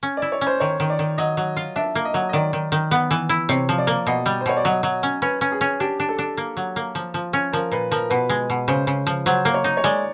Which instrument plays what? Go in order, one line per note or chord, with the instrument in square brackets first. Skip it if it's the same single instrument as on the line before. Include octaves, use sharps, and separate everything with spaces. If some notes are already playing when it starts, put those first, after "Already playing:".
[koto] C#4
[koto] E4 [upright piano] D5
[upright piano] C#5
[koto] C#4
[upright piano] C5
[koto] D#3 [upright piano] C#5
[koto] D#3
[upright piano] D5
[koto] D#3
[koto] F#3 [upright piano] D#5
[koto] F#3
F4
[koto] D4 [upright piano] E5
[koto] A#3
[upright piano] D#5
[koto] F#3
[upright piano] D#5
[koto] D#3 [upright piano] D5
[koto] D#3
D#3
B3
E3
E4
[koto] C3 [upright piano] C#5
[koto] F3
[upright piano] D5
[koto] A#3
[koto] B2 [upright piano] D#5
[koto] G3
[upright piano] C5
[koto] B2 [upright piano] C#5
[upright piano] D5
[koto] F#3 [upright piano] D#5
[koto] F#3
C#4
[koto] C#4 [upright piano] B4
[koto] C#4
[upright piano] G#4
[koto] C#4
[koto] D4 [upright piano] G4
[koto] D4
[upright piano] A4
[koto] D4
A#3
F#3
A#3
F3
F3
C#4
[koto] F3 [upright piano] A#4
[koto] A#2 [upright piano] B4
[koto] F3 [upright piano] A#4
[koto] B2 [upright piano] B4
[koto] G#3
B2
[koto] C#3 [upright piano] C5
[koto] C#3
F3
[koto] F#3 [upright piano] C5
[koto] A#3
[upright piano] C#5
[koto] D#4
[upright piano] C#5
[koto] G#3 [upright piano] D5